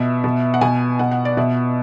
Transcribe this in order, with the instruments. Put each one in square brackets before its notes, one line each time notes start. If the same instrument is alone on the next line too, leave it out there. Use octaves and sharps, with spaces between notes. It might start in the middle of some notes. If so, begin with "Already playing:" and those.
Already playing: [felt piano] B2 E5
B2
F#5
B2 G#5
B2 F#5
F#5
D5
B2 E5